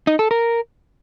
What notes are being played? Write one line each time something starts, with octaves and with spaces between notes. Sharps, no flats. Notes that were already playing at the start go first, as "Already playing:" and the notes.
D#4
A4
A#4